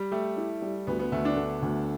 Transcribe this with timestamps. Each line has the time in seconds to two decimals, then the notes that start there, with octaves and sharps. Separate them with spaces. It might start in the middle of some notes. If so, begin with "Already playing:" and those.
Already playing: G3
0.11 A3 G4
0.37 E4
0.62 G3
0.87 D2 B3
0.99 B3
1.12 D2 A3
1.25 D4
1.37 D3
1.62 D2